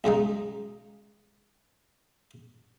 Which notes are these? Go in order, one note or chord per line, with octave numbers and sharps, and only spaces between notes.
B1 C#3 G#3 D#4